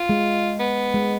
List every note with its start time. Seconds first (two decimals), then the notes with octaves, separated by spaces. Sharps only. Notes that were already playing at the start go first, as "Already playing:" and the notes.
Already playing: F4
0.09 G#3
0.60 B3
0.94 G#3